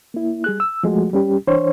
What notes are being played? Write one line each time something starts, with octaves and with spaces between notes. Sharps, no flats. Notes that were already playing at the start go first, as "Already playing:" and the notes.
A#3 E4
G3 G#4 F#6
E6
F3 G#3 A3 F#4
G3 C#4 G4
E3 D4 C5 C#5